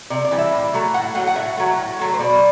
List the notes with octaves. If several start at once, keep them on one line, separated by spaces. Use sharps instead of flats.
C3 D5
D5
E3 G3
E5
A2
F#3 A3
A2 F#5
F#3 A3 F#5
F#5
A2 E5
F#3 A3
A2
F#3 A3
C5
B2 D5